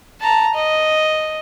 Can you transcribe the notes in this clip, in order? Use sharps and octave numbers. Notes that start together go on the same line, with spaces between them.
A5 A#5
D#5